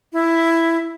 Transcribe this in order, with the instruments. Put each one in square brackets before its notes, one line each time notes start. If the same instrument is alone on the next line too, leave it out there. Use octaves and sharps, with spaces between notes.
[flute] E4